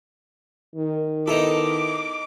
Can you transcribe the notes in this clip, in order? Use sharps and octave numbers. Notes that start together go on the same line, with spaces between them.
D#3
B3 D#4 E4 A4 D6